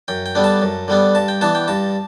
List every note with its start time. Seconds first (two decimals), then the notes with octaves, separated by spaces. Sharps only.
0.08 F#2 G5
0.26 G5
0.35 D3 G3 B3 D4
0.44 A5
0.62 F#2
0.88 D3 G3 B3 D4
1.15 G2 A5
1.28 G5
1.41 E3 B3 D4 A5
1.55 G5
1.68 G2 A5